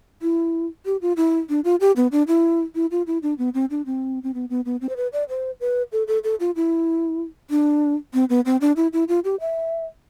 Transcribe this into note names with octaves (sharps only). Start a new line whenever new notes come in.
E4
G4
F4
E4
D4
F4
G4
B3
D4
E4
E4
F4
E4
D4
B3
C4
D4
C4
C4
B3
B3
B3
C4
C5
B4
D5
C5
B4
A4
A4
A4
F4
E4
D4
C4
B3
C4
D4
E4
E4
F4
G4
E5